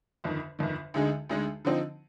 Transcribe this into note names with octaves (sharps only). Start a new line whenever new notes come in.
G1 F2 D#3
G1 F2 D#3
D2 D3 G#3 D#4 G#4
D2 D3 G#3 D#4 G#4
D3 F3 C4 D#4